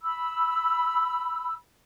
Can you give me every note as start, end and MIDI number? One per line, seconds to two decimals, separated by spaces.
0.02 1.53 83
0.02 1.53 88